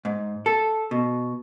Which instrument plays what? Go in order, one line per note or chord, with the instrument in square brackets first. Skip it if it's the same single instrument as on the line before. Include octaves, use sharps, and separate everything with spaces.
[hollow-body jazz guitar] G#2
A4
B2